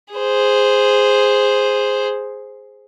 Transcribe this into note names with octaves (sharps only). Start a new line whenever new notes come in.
G#4 C5